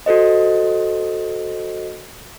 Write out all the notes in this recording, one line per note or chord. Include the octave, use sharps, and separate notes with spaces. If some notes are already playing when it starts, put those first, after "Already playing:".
F#4 A4 C5 D#5